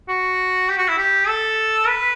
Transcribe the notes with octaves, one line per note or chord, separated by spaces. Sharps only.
F#4
G4
F#4
E4
G4
A4
B4